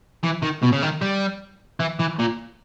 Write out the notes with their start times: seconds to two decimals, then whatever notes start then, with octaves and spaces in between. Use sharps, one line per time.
0.24 E3
0.43 D#3
0.63 B2
0.72 C#3
0.82 D#3
1.02 G3
1.80 E3
1.99 E3
2.19 A#2